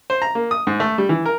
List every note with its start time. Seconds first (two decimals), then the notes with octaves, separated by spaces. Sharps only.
0.10 C5
0.22 A#5
0.35 A#3
0.51 D#6
0.67 G#2
0.80 A3
0.98 G3
1.09 E3
1.25 A#4